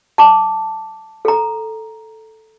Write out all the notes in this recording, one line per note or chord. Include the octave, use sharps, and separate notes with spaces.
A5 D6
A4 A#5